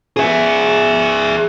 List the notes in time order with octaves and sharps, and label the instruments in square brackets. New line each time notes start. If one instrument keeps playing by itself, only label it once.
[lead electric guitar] G#4 E5